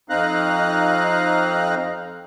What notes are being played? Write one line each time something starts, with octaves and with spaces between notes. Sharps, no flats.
F2 C4 D#4 F5 A#5 F#6